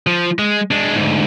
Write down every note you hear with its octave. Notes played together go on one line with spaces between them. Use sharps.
F3
G#3
G#3 D4
D2 G#2